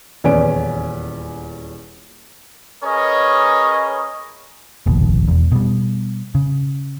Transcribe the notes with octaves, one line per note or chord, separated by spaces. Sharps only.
D#1 E2 C#4 B4 G#5 D7
C#4 G#4 A#4 B4 C#5 D#5
F1 A#1 D#2 B2
E1 E2
B2 G3
C#3